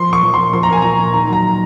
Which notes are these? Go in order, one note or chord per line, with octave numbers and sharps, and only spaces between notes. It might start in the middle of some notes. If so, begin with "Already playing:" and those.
Already playing: F3 C6
A#2 C#6
F3
A#2 C6
F3 C6
A#5
A#2 G#5
F3 A#5
A#2
D#3 A#5
F#3 A#5